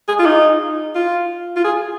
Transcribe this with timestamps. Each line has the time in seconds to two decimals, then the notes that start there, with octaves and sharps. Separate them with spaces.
0.08 G#4
0.19 F4
0.26 D#4
0.95 F4
1.56 F4
1.64 G#4